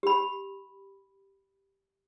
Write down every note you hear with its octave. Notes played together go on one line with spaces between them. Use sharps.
G4 B5